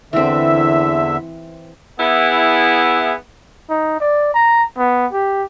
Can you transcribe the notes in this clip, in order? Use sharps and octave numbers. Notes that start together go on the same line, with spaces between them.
E2 D3 E3 C4 E5
B3 E4 G#4
D#4
D5
A#5
B3
G4